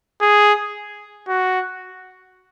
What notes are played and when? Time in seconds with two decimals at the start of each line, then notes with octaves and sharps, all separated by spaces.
0.22 G#4
1.28 F#4